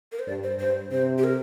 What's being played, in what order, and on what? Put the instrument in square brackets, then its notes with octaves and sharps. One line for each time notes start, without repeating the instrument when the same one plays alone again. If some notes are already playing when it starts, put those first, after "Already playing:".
[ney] A#4
C5
[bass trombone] G2 [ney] D5
[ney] C5
[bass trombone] G2 [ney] C5
[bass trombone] C3 [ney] C5
[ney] G4
A#4